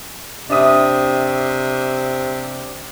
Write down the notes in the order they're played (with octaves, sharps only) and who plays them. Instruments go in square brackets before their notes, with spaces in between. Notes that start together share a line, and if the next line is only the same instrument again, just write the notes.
[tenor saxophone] C3 [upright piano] D4 E5 D#6